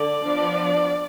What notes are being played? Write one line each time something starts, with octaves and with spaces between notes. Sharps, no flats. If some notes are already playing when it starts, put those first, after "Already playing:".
Already playing: D3 D5
F3 B3 D4